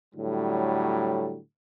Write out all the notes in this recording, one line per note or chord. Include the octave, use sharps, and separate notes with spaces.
A2 D3 F#3 G3